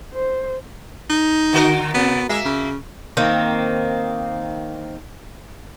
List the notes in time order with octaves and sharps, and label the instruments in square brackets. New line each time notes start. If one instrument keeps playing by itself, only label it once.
[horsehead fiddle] C5
[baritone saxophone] D#4
[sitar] D3 F#4 A#4
[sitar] C3 [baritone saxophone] B3
[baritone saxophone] G#3 [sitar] A#3 E5
[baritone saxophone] C#3
[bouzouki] D#3 A#3 C4